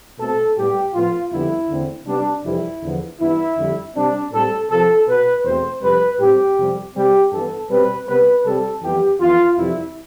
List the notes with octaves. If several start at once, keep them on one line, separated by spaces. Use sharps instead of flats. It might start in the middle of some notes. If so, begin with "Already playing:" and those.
B2 A3 C4 A4
A2 G3 B3 G4
A2 F3 B3 F4
F2 D3 G3 B3 E4
E2 D3 A3 C4
C3 G3 B3 D4
F2 C3 E3 G3 C4 E4
E2 D3 F3 B3
G2 E3 B3 E4
F2 D3 G3
C3 G3 C4 D4
A2 G3 C4 A4
C3 F3 C4 A4
B2 B3 B4
E2 B2 A3 C4 C5
F2 C3 G3 B4
A2 G3 C4 G4
F2 C3 G3 C4
C3 G3 C4 G4
G2 E3 B3 A4
B2 G3 C4 B4
C3 G3 B3 B4
C3 G3 C4 A4
F2 E3 G3 B3 G4
F2 E3 B3 F4
F2 C3 E3 G3 E4